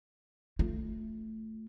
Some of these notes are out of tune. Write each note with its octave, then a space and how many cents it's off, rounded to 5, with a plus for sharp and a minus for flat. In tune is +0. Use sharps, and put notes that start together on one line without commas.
A3 +0 F4 +0